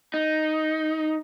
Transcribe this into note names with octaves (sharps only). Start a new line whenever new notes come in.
D#4